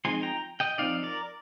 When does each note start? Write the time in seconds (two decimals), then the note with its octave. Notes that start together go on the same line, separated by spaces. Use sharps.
0.05 F3 G#3 C4 D#4 G#5 C6
0.23 G5 A#5
0.60 D#5 G5
0.78 F3 C4 D#4 D5 F5
1.03 A#4 D5